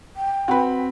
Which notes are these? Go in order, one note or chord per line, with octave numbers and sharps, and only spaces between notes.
G5
C4 F#4 B4 B5